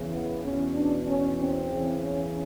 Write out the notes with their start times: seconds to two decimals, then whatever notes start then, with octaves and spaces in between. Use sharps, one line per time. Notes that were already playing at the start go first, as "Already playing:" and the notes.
Already playing: E2 C#3 E3
0.12 B3
0.43 E2 B2 C#4
0.75 D4
1.07 C#4
1.38 C4
1.70 E2 C#3 E3
2.01 C#4